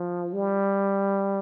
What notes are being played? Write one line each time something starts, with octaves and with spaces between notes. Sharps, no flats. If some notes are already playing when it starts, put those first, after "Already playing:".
Already playing: F3
G3